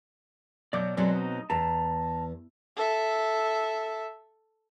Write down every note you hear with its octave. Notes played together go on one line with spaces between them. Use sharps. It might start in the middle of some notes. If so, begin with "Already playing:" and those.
B2 F#3 D5 D6 G6
B2 F#3 G#3 C4 D5
D#4
E2 A5 A#5
A4 E5